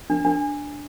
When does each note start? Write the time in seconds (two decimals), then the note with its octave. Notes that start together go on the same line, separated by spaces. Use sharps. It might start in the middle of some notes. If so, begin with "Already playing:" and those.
0.10 D4
0.25 D4